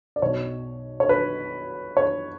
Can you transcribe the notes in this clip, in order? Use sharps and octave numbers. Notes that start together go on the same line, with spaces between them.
D5
B1 B2 C#5
C#5
B4
C#5